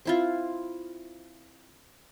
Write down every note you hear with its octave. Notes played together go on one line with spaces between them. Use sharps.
C4 E4 F4